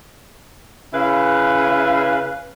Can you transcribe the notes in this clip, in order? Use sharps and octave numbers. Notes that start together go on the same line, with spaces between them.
C#3 E4 B4 F5